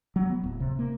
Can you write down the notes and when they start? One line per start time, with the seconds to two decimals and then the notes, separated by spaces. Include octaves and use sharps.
0.16 F#3
0.29 B3
0.44 D1
0.60 C3
0.79 A#3